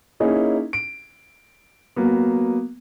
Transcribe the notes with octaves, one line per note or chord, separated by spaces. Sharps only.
A#3 C#4 D#4 E4 G#4
D7
F#3 A#3 B3